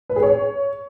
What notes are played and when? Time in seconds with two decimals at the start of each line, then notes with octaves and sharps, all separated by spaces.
0.10 B4
0.16 G#4
0.23 C#5